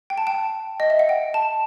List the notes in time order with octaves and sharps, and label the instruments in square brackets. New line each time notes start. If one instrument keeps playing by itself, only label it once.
[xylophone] G5
A5
G5
D#5
E5
F#5
G5
A5